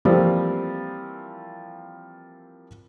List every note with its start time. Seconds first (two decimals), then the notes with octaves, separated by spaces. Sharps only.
0.05 E3 F3 G3 A3 A#3 C4